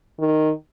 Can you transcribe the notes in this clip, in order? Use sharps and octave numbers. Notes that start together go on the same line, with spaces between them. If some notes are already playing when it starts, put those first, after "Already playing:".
D#3